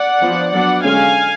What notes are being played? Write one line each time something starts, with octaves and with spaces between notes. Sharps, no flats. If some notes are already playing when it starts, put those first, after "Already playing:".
Already playing: D5 F#5
F3 B3 D4
F#3 B3 D4 D5 F#5
D3 G#3 C#4 F5 G#5